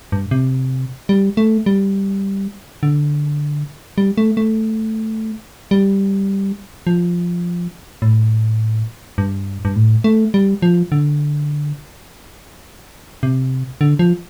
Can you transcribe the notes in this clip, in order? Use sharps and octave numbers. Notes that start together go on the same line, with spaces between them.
G2
C3
G3
A3
G3
D3
G3
A3
A3
G3
F3
A2
G2
G2
A2
A3
G3
F3
D3
C3
D3
F3